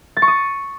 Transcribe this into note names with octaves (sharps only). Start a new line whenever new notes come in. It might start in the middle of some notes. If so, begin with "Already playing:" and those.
A6
C#6
D#6